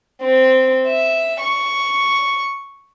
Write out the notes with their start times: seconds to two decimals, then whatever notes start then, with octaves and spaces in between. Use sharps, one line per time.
0.22 C4
0.87 E5
1.41 C#6